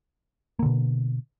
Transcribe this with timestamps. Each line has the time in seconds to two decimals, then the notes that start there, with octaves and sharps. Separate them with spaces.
0.59 A#3
0.63 D3
0.66 B2